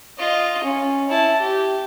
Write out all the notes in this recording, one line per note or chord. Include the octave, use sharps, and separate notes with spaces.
F4 D#5
C#4
E4 A5
G4